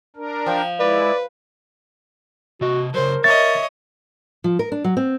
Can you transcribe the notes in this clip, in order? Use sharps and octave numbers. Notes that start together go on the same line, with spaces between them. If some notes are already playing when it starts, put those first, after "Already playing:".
D4 A#4
F3 G5
G#3 E4 B4 D5
C3 F#4 D#5
C#3 F#3 A#4 C5
C#5 D#5 E5 A6
F3
A#4
D4
F#3
C4